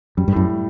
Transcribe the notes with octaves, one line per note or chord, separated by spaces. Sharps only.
F#2 G3
G2
F#2 A2